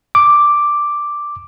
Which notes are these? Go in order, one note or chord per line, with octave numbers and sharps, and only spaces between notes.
D6